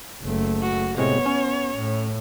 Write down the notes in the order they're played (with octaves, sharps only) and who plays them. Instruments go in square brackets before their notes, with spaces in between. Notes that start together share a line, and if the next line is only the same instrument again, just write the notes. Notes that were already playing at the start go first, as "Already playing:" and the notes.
[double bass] F#1 A3
[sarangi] F#4
[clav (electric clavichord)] A2 C3 G#3 [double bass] B3 [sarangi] C#5
[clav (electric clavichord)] C#4
[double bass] A2